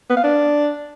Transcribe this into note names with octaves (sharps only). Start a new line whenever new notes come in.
B3
F5
D4